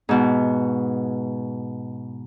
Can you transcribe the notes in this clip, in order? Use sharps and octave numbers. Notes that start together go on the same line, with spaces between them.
G#2 B2